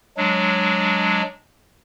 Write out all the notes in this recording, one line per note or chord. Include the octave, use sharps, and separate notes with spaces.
F#3 G#3 D4